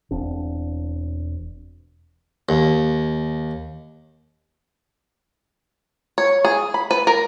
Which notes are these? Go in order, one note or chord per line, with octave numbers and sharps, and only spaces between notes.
E1 C4 D4
D#2
C#5
G#4
B5
B4
A#4